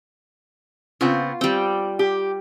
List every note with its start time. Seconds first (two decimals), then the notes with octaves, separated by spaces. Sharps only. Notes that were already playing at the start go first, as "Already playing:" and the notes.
1.01 C#3 B3 C4 F4
1.41 G3 C4 G5
1.99 G4